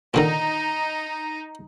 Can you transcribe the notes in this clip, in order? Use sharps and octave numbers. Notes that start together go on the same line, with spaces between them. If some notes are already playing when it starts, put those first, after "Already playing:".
A#2 D3 D#3 D#4